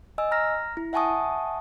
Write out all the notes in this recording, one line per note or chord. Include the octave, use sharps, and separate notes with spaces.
D#5 G#5 E6
A#5 F6 A#6
E4
E5 F#5 G#5 A5 C#6 D#6